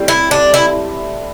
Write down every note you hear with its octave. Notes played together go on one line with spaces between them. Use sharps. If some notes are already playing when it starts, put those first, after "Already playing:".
Already playing: A2 G3 C4
E4
D4
E4